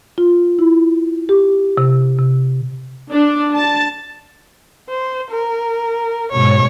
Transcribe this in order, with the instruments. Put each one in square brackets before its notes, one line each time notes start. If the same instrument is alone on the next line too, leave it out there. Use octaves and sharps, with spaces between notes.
[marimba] F4
E4
G4
C3
C3
[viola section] D4
A5
[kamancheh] C5
A#4
[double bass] G#2 B2 [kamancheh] C#5